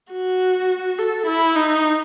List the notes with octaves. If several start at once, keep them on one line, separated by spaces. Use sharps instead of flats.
F#4
A4
E4
D#4